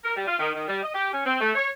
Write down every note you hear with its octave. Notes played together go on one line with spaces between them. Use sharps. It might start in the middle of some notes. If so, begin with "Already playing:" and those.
A#4
G3
F4
D#3
D#3
G3
D#5
G4
C#4
C4
A3
C#5